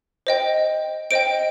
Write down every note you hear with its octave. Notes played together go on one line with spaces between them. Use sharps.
C5 D#5 G5
C5 D#5 G5 D7